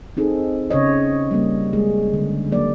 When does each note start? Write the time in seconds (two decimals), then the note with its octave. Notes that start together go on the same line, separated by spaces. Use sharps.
0.17 C4 D#4 G#4 A4
0.71 C#3 C#4 C#5 D#5
1.31 G3 A#3
1.73 G#3 G#4
2.13 D3
2.52 F#3 A#3 D5